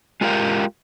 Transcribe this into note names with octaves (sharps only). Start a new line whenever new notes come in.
G#3 F4 G4 A#4 F5 G5